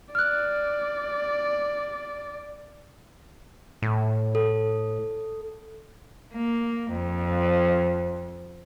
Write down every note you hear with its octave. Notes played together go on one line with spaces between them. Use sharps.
D5 F6 F#6
A2
A4
A#3
F2